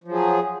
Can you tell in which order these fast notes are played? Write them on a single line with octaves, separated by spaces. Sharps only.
F3 F#3 G#4